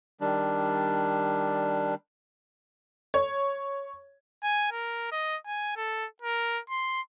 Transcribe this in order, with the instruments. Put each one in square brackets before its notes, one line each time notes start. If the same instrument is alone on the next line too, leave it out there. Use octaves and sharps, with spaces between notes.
[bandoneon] D#3 G3 D4
[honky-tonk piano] C#5
[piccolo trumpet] G#5
A#4
D#5
G#5
A4
A#4
C6